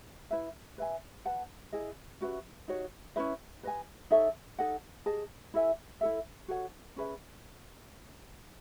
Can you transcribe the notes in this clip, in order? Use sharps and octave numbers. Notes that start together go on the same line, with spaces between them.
E4 B4 E5
B4 E5 G#5
B4 F#5 A5
E4 G#4 D#5 G#5
C#4 F#4 B4 E5
D#4 F#4 C#5
C#4 E4 B4 E5
B4 D#5 G#5
D#4 A4 C#5 E5
D#4 A4 D#5 F#5
G#4 D#5 A5
E4 A4 E5 G#5
E4 A4 E5
F#4 A4 C#5 F#5
C#4 G#4 B4 E5